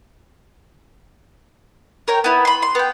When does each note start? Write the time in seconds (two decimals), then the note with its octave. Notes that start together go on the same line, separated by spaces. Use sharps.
2.08 A#4 C#5 G5
2.24 B3 E4
2.45 B5 C6
2.62 C6
2.75 B3 G5